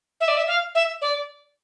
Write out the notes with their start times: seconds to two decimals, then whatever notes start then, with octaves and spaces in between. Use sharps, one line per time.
0.21 E5
0.28 D5
0.37 E5
0.48 F5
0.75 E5
1.02 D5